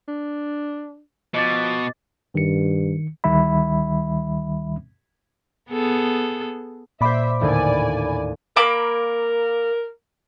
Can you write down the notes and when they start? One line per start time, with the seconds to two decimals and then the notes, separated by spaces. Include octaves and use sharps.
0.08 D4
1.34 B2 F3 D#5 D6 A6
2.35 G2 D#3 C#7
3.24 D2 D#3 G3 E5 B5
5.71 B3 G#4 A4
7.01 A#2 C5 D5 E5 B5 D6
7.41 D#2 A2 D3 D5 G#5
8.56 A#3 A#4 B5 D6